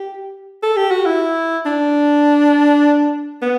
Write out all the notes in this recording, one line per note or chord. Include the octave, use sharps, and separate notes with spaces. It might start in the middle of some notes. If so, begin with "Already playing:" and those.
Already playing: G4
A4
G4
F#4
E4
D4
B3